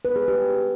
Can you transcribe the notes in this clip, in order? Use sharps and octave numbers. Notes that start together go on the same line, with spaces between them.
B4
G#4
G4